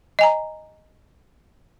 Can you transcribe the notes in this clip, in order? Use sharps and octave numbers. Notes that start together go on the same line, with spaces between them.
D#5 G#5 A#5